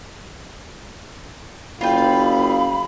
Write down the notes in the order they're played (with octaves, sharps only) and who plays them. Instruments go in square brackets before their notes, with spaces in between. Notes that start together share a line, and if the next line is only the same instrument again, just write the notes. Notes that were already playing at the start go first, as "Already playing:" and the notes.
[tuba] F#1 [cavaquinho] F4 G5 [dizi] F5 [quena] B5